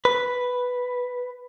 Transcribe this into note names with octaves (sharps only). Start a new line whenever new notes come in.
B4